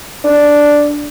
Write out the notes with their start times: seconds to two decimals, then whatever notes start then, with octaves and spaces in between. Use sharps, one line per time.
0.24 D4